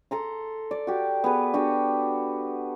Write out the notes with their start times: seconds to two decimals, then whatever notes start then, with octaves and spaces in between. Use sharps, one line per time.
0.11 A4 A#5 C6
0.71 D5
0.87 F#4 G4
1.24 B3 G#4 B4
1.54 D4 F#4 G4